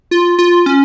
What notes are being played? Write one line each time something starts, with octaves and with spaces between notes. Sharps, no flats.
F4
F4
C#4